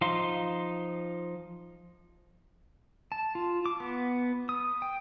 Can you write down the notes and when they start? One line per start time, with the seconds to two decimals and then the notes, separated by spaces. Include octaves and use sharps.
0.01 F3 D#4 F5 C6
3.12 A5
3.35 F4
3.66 D6
3.80 B3
4.49 D#6
4.82 G5